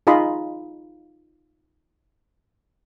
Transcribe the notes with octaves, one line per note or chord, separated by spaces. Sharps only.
D#4 F4 G#4 D#5 B5 C6